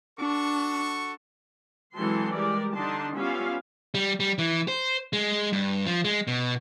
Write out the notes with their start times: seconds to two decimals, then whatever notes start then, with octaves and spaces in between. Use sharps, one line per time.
0.20 D4 F#4 A4 C#6
1.95 E3 F#3 G#3 C4 A4 C6
2.35 G3 G#3 G4 A#4 D5
2.76 D3 D4 D#4 A5 C6
3.18 G3 B3 C#4 F4 E5 F5
3.94 G3
4.20 G3
4.38 E3
4.68 C5
5.13 G#3
5.52 G2
5.86 F3
6.04 G#3
6.27 B2